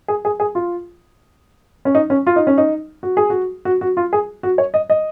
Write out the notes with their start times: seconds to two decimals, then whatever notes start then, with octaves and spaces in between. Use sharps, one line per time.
0.08 G#4
0.25 G#4
0.40 G#4
0.55 F4
1.85 C#4
1.95 D#4
2.10 C#4
2.27 F4
2.36 D#4
2.47 C#4
2.58 D#4
3.03 F#4
3.17 G#4
3.30 F#4
3.65 F#4
3.81 F#4
3.97 F4
4.13 G#4
4.43 F#4
4.58 C#5
4.74 D#5
4.90 D#5